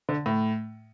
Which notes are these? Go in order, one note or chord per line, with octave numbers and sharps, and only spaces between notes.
D3
A2